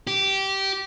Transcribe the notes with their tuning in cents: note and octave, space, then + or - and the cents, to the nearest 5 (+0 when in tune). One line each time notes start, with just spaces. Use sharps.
G4 -15